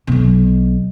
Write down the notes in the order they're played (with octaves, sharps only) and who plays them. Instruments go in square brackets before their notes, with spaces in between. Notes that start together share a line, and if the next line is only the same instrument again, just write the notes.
[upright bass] B1 B2